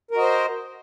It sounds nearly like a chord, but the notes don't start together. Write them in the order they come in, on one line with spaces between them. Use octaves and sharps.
A#4 F#4 D#5 C5